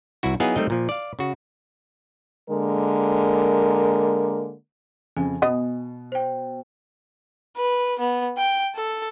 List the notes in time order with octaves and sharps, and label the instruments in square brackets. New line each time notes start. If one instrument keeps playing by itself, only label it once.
[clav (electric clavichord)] C2 E4 F#4
F#3 B3 D#4 E4 G#4 F5
G3 A3 C4 D#4 A#4 D#5
A#2 F3
D5 F5
C#3 F#4
[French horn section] D3 G#3 A#3 A#4
[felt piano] F2 C#3 [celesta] G#5
[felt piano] B2 [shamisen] B3 D#5
[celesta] C5 G5
[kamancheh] B4
B3
G5
A4